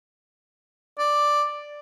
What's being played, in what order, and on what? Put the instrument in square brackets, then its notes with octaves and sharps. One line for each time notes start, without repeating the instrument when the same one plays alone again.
[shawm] D5